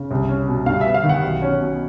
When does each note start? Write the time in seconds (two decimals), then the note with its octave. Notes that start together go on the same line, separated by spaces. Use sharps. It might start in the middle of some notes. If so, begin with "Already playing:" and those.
Already playing: C#3
0.11 C2
0.29 C#4
0.48 B2
0.66 G2 F5
0.81 E5
0.86 B3
0.94 F5
1.04 D#3
1.09 F#5
1.23 B1
1.42 C#4
1.60 B2